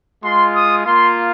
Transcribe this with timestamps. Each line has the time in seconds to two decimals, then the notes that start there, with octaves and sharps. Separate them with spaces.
0.24 G#3 F4 C6
0.54 D#6
0.85 A#3 F4 C6